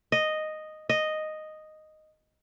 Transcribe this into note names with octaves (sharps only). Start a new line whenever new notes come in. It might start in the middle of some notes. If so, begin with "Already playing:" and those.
D#5
D#5